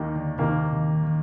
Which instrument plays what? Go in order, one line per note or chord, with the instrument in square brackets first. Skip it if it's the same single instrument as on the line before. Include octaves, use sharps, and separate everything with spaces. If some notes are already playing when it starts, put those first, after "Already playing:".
Already playing: [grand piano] D#2 D#3 A#3
[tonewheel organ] D3
[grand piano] D#2 D#3 A#3 [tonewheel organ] C3
[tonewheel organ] D#3
D#3